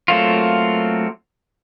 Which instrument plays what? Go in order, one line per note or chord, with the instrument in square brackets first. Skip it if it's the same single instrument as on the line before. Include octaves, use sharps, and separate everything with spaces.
[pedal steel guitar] F#3 A3 A#3 C4 F4